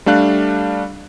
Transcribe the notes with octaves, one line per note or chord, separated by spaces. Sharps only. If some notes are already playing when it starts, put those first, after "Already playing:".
G3 A3 D4 F5 F#6